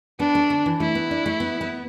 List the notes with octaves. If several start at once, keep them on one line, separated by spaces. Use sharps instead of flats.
B3 D4
A3
D3
E3
A3 E4
B3
D4
A3
B3
B3